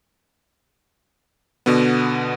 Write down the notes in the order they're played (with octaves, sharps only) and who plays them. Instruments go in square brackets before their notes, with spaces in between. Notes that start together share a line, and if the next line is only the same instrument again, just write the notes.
[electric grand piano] B2 D3 B3